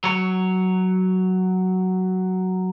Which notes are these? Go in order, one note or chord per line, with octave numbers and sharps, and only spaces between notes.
F#3 C#5